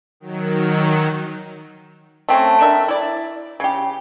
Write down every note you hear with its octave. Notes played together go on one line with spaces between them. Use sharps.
D#3 F#3
A3 C4 C#4
G#3 D4 A#4 E5
E4 D5
C#3 G4